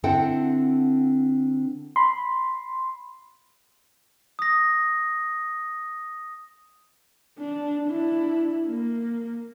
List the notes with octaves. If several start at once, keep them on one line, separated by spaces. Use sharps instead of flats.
D3 C4 E4 A4 F#5 G5
B5 C6
D#6 A#6
D4
D4 E4
A#3